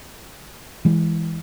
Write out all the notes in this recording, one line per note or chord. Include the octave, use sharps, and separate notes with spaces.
E3 G#3